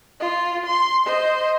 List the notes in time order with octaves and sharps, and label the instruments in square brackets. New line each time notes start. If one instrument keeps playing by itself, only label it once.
[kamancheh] F4
C6
C5 D#5